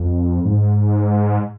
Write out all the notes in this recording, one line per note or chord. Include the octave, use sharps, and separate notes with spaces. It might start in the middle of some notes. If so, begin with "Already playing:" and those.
Already playing: F2
G#2